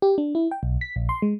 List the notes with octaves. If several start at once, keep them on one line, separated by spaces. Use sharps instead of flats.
G4
D4
E4
G5
B1
B6
A#1
C6
G#3